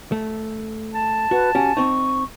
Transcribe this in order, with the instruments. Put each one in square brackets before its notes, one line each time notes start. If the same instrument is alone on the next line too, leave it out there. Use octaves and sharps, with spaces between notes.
[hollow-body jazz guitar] A3
[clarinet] A5
[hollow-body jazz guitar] F#4 [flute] B4
[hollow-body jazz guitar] C#4 F#4 G4 [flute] G#5
[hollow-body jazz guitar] C4 D#4 [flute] C#6